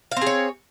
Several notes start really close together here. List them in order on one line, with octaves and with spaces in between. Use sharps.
F5 C4 G#4 C#5